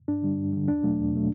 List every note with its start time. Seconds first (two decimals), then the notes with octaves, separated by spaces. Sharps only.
0.08 G2 D4
0.22 D3 G3
0.37 G2
0.53 D3 G3
0.68 E2 D4
0.83 B2 F#3 A3
0.99 E2
1.13 B2 F#3 A3